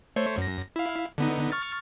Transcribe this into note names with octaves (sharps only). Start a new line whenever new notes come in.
A3 C5 C#5
F#2 A#6
E4 F5
D3 B3 D#4
C#6 F6 A6